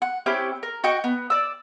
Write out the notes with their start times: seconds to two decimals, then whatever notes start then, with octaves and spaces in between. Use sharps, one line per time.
0.02 F#5
0.26 C4 C#4 E4 G4
0.63 A#4
0.84 F#4 D#5 G5 C#6
1.04 B3
1.30 D5 E6